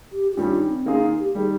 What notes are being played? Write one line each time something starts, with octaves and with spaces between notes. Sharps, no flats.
G4
G4
G2 D#3 G3 C#4 F4
D#4
C4
D#3 A#3 C#4 F4 G#4
D#4
G4
D#3 G3 G#4